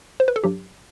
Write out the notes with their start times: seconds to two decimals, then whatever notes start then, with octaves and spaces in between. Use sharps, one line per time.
0.20 C5
0.28 B4
0.36 A4
0.44 G2 F#3 G4